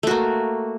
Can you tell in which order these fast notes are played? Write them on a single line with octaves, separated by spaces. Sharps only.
A3 F#4 A#3